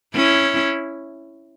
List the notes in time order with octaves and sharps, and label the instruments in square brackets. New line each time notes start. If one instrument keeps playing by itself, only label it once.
[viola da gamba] C#4 E4